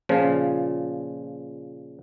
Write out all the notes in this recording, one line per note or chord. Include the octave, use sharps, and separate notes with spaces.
A#2 C#3 F3